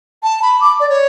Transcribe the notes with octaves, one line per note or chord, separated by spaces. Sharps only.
A5
B5
D6
D5
C#5